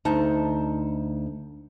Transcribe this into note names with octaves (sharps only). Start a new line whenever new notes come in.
D2 D#4 A5